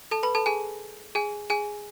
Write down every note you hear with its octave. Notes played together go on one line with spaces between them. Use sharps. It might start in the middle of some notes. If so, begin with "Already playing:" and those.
A4 A5
B4 B5
A4 A5
G#4 G#5
G#4 G#5
G#4 G#5